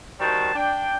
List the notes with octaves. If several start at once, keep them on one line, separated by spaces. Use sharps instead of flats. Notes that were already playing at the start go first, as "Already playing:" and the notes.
D#3 G3 F#4 C5 A5
D4 G5